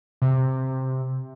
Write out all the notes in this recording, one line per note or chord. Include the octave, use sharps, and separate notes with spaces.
C3